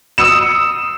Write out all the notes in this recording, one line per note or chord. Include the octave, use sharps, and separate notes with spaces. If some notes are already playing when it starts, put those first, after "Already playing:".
D#6 E6 C#7 E7